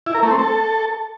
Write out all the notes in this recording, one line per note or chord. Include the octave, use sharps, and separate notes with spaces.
E4
A#4
A3
C4
A4